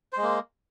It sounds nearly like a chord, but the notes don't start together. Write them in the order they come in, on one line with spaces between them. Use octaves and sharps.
C5 G#3 A#3